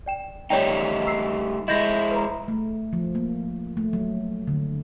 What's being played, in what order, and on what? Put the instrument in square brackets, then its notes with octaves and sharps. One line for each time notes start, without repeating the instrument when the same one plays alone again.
[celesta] D5 G5 E7
[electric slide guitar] G3 A3 D#4 [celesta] C#5 D5 G5
[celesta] E6 C7
[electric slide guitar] G#3 E4 [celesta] D#5 G6 A#6
[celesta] B4 A#5
[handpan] A3
F3
A#3
A3
F#3
D3